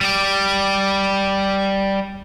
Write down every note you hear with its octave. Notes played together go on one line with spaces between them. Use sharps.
G3 G4